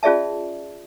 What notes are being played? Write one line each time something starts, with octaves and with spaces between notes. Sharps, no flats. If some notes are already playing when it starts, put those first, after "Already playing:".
C#4 F4 G#4 D5 E5 A5